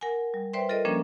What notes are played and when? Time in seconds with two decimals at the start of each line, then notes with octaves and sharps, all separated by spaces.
0.01 A#4 F#5 G#5
0.34 G3
0.53 B4 C5 D5 E5 G5 C6
0.69 F4 A4 A#4 D5 D#5
0.85 F3 G3 A#3 C#4 D4